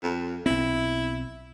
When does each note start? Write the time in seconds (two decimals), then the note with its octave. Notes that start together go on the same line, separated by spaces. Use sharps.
0.02 F2
0.46 B1 C4 E4